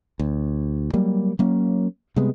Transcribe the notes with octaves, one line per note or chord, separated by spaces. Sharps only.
D2
F#3 G3 A#3
F#3 A#3 C#4
C3 G3 G#3 B3